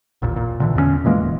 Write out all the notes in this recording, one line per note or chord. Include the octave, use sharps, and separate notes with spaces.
A1 D#2 A#2
A#2
A#2 D3 E3
E2 D3 A3 C#4
A#2 E3 G#3 A#3
D#1